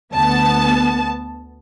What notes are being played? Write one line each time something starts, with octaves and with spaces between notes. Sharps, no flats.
D2 B3 A5